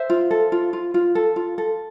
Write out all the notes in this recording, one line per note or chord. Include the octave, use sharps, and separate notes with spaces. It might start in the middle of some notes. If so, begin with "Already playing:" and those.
Already playing: C5 E5
F4
A4
F4
F4
F4
A4
F4
A4